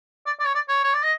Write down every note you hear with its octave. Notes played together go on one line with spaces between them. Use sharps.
D5
D5
C#5
D5
C#5
C#5
D5
D#5